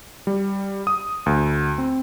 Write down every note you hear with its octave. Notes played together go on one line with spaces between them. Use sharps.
G3
D#6
D2
C4